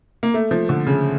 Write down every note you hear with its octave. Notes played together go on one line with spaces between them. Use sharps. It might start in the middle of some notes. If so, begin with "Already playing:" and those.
A#3
A3
F3
D3
C#3